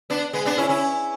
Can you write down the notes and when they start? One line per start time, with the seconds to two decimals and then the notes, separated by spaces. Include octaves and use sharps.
0.10 B3 D4
0.33 G#3 B3
0.45 B3 D4
0.57 C#4 E4
0.69 C#4 E4